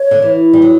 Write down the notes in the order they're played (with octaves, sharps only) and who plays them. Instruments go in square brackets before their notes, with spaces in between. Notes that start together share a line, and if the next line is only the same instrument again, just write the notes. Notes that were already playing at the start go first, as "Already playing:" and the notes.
Already playing: [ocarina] C#5
[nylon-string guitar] D3
E3
G3
F#3